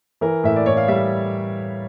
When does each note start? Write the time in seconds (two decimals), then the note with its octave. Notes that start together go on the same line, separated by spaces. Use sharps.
0.21 E3 A#4
0.44 A2 E5
0.56 D5
0.66 A2 C#5
0.77 F5
0.88 G3 E5